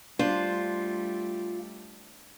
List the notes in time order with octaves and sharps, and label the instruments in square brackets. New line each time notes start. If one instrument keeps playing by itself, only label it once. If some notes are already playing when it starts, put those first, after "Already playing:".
[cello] G3 A3 [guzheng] D4 C5 [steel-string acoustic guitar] F4